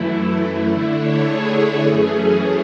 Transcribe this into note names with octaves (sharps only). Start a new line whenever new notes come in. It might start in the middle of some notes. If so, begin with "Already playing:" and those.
Already playing: F#2 E3 A3 E4
D3 A3 D4 E4
C#5
G#4
F#2 E3 A3 C#4